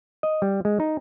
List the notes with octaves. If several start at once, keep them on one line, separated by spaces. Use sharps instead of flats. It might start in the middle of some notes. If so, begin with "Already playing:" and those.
D#5
G3
G#3
D#4